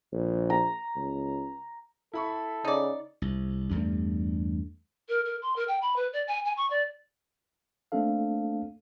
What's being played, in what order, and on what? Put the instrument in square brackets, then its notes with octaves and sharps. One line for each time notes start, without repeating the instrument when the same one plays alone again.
[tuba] A#1
[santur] A#5
[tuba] C#2
[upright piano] E4 B5 C#6 [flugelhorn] A4
[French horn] C#3 [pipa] D#4 D5
[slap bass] C2
E2 G2 G3 A3
[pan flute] A#4
A#4
C6
A#4
G5
B5
B4
D5
G#5
G#5
C#6
D5
[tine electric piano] A3 A#3 C4 D4 A4 F5